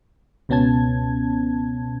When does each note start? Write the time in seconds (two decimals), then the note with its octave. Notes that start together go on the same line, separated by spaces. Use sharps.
0.49 C#2 B2 B3 C#4 A5 G#6